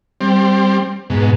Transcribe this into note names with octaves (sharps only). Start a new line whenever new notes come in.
G3 C4
G#2 B2